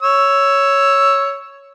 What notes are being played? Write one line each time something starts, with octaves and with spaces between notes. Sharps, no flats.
C#5 E6